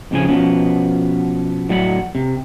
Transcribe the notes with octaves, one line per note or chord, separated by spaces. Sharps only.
F2 A2 C#3 F3 G#5
B2 F3 B3 C#4 B4
A2 F#3 D5 F#5 G#5 B5
C3